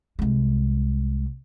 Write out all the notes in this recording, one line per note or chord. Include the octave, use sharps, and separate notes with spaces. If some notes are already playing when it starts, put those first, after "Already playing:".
C2 G#3